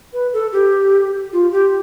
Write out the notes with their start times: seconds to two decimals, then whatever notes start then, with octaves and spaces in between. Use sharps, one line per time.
0.13 B4
0.33 A4
0.52 G4
1.33 F4
1.52 G4